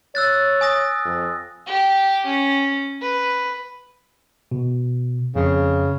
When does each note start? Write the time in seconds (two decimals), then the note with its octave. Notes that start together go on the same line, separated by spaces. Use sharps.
0.15 C#5 E6 F#6 A6
0.61 G#5 D#6 A#6
1.05 F2
1.67 G4
2.25 C#4
3.01 B4
4.51 B2
5.35 F2 C#3